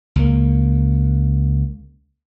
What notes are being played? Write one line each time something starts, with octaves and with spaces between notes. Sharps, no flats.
C#2 A#3